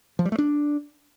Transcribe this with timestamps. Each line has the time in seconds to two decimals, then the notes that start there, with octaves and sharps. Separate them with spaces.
0.19 F3
0.25 G3
0.32 A3
0.38 D4